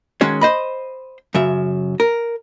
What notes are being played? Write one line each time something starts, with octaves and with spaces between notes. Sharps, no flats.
D#3 G#3 C#4 F#4 C#5
C5 D#5 B5
F#2 C#3 E5
A#4